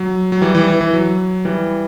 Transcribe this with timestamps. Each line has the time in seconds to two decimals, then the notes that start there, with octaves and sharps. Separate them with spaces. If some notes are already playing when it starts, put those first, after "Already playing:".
Already playing: F#3
0.32 F#3
0.42 E3 G3
0.55 E3 G3
0.68 E3
0.81 E3
0.94 F#3
1.45 E3 G3